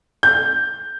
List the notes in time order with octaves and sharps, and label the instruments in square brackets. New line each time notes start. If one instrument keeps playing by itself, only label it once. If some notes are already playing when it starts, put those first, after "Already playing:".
[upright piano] G6